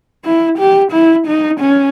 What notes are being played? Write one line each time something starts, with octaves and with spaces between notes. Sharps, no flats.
E4
G4
E4
D#4
C#4